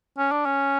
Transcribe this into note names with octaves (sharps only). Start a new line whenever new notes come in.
C#4
D4
C#4